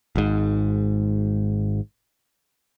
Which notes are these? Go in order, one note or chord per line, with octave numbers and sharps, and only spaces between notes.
G#1 G#2